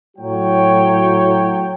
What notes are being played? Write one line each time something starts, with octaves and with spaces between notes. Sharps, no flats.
A2 F#3 F#4 C#5 G5